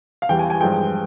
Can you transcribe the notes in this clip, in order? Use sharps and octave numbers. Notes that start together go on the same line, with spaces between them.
F5
E2 E3 G3 G5
G#5
G#5
G2 F3 G#3 G5